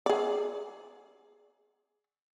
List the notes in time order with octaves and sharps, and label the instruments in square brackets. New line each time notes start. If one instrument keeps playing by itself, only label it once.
[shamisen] G#4 D5